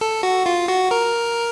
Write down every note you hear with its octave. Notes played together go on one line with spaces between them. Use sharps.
A4
F#4
F4
F#4
A#4